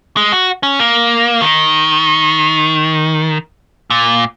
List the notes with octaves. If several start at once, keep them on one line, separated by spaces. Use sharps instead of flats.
G#3
F#4
C#4
A#3
D#3
A#2